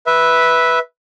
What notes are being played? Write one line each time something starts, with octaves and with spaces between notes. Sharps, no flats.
B4 E5